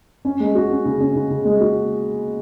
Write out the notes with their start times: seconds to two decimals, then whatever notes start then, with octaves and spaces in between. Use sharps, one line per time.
0.25 C#4
0.40 G#3
0.55 F#4
0.71 C#4
0.85 C#3
1.00 C#4
1.15 C#3
1.30 C#3
1.45 G#3
1.61 F#4